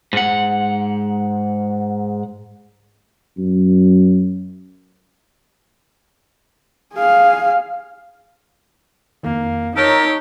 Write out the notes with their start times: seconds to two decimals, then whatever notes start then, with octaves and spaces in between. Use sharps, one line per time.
0.13 G#2 F#5
3.37 F#2
6.95 G#4 F5
9.23 F2 D#3 A#3
9.77 D#4 G4 A#4 C#5 A5 A#5 E6